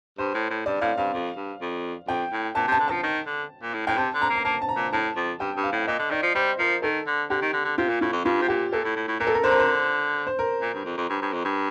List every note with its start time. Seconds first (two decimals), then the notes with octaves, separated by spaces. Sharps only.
0.18 G2 C5
0.35 A2
0.50 A2
0.66 G2 D5
0.81 A2 F5
0.98 G2 F5
1.13 F2
1.37 G2
1.61 F2
2.08 F2 G5
2.33 A2
2.55 A#2 A5
2.68 C3
2.72 A5
2.80 D3
2.88 F3 A5
3.03 D#3
3.27 D3
3.62 A#2
3.74 A2
3.87 A2 G5
3.98 C3 A5
4.14 D3
4.22 A#5
4.30 A#3
4.36 A#5
4.45 A#3 A5
4.62 A5
4.69 A#5
4.76 A#2
4.93 A2 A5
5.16 F2
5.40 G2 G5
5.57 G2
5.64 F5
5.73 A2
5.87 A#2 D#5
5.99 D3
6.11 D#3 D5
6.23 F3
6.35 G3 C5
6.59 F3 A#4
6.82 D#3 A4
7.07 D3
7.30 D3 G4
7.42 D#3
7.53 D3
7.65 D3
7.78 C3 F4
7.89 A#2
8.01 A2 F4
8.13 F2
8.25 G2 F4
8.42 C3
8.48 A#2 G4
8.72 A#2 A4
8.85 A2
8.96 A2
9.08 A2
9.20 A#2 A#4
9.27 A4
9.34 A#4
9.44 D3 C5
9.51 A#4
9.59 C5
10.27 C5
10.39 A#4
10.62 A#2
10.74 G2
10.85 F2
10.98 F2
11.10 G2
11.22 G2
11.33 F2
11.45 G2